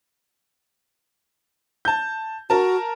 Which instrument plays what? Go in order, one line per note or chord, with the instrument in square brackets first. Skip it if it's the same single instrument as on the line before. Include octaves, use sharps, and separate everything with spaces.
[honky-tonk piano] A5 G6
[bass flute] F#4 [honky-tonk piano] A#4 A5